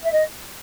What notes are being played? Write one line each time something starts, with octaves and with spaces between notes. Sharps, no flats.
E5
D#5